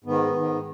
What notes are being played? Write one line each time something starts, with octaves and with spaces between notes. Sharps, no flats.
G#2 D#3 B3
G#2 D#3